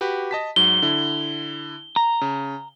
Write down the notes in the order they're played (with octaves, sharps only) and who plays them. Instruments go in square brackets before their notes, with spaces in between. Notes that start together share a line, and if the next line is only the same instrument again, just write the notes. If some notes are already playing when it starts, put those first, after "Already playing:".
[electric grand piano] F#4 G4 B4
D#5 A5 B6
[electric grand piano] G#2 F#3 [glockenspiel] G7
[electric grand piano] D3 E4
[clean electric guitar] A#5
[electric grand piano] C#3